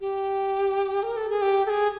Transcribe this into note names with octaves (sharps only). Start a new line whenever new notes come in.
G4
A#4
A4
G#4
G4
A4
G#4